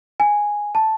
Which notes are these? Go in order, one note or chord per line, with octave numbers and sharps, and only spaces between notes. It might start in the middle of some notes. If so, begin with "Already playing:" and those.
G#5
A5